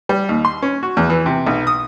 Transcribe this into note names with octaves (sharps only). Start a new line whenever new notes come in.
G3
D#2
C6
C#4
F#4
E2
E3
C3
B1
D#6